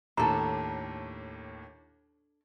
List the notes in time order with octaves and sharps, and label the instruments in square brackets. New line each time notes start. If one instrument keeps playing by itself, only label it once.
[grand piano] D#2 A2 [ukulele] D4 A4 [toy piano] A#5